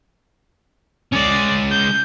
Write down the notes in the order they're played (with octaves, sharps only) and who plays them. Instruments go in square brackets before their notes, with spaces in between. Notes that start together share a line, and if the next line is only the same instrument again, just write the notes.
[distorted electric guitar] G#3 C#4 [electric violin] D5
[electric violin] G6